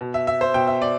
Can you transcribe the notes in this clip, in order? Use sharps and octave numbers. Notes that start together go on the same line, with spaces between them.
B2
E5
E5
C5
B2 G5
E5
D5